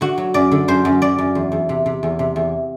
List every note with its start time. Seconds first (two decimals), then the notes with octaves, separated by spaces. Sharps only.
0.01 D3 F#4
0.18 F#3
0.34 F#2 D5
0.51 D3
0.68 F#2 C5
0.85 F#2
1.02 F#2 D5
1.18 F#2
1.35 E2
1.52 E2
1.69 C3
1.86 C3
2.03 E2
2.19 C3
2.36 E2